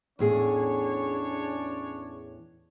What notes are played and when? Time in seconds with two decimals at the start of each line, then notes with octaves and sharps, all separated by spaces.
0.19 E2 A2 C#4 D4 G#4 C#5